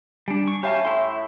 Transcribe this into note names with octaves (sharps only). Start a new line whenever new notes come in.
G3 D4 G#5
C#6
C#4 G4 E5 F5 A5 B5 G6
A2 E4 C6